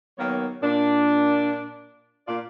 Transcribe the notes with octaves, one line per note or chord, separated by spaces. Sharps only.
D#3 F#3 A#3 B3 C#5
A#2 D4
A#2 F4 D5